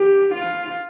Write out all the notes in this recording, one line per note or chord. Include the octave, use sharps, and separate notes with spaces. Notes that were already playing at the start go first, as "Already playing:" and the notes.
Already playing: G4
F4